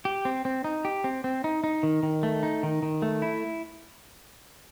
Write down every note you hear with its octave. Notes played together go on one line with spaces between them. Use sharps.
G4
C4
C4
D#4
G4
C4
C4
D#4
D#4
D#3
D#3
A3
D#4
D#3
D#3
A3
E4